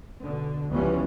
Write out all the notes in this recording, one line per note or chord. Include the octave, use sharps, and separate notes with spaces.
B2 D3
C#2 E3 F3 G3 B3 C#4